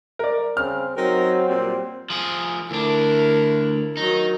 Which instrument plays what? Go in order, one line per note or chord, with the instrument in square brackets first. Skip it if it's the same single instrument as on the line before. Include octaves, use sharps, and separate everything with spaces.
[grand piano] A#4 D5
[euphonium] C#3 [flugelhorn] C4 [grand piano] F6
[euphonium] F#3 [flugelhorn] C4 [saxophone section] D#4 F#4 A#4
[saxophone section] A#2 G3 [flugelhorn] C4
[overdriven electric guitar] F3 G#4
[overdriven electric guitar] D2 D4 [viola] E4 A#4
[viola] D#3 F#3 [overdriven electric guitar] D#4